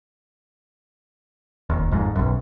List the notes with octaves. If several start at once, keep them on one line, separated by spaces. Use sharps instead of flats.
F1 D#2
G#1 F2 G#2
B1 F#2